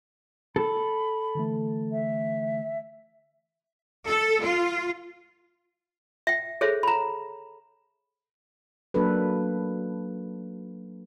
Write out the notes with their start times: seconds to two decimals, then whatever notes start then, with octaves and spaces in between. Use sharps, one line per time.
0.56 A4 B5
1.35 D3 E3 A3
1.92 E5
4.07 A4
4.43 F4
6.27 E5 G5
6.61 G#4 A4 C5 C#5 E5
6.83 A#5 B5
8.94 F#3 A#3 D4 A4 B4